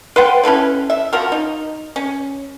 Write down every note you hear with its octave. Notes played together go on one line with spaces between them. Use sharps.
B4 C5 F#5 G5
C#4 E4 A4 B4
E5
F3 F#4 A#4
D#4
C#4